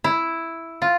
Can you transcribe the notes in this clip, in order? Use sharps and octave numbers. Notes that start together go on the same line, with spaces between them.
E4
F4